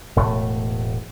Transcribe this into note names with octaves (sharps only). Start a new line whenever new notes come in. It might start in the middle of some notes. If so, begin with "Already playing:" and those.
E1 A2 A3